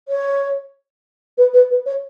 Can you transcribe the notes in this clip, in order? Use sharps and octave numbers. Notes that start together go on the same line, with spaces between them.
C#5
B4
B4
B4
C#5